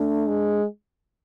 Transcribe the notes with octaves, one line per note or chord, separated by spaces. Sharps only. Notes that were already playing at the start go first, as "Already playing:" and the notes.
Already playing: A3 D4
G#3